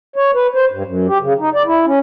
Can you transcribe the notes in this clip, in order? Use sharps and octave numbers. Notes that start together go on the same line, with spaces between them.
C#5
B4
C5
G2
F#2
G4
C#3
D#4
D5
E4
C#4